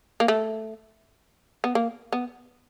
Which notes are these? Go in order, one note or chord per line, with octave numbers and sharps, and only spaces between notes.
A#3
A3
B3
A#3
B3